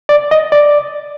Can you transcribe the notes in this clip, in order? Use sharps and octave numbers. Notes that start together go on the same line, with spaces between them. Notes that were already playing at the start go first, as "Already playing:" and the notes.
D5
D#5
D5